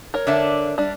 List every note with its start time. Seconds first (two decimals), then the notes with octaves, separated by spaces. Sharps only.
0.14 A#4 C#5
0.27 D3 D4 E5
0.78 G3 D4